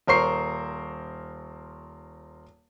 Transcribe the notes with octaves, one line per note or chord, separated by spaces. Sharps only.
D#1 A#4 C5 C#6 C7